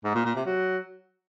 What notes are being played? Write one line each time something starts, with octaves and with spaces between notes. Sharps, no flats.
G#2
A#2
A#2
C3
F#3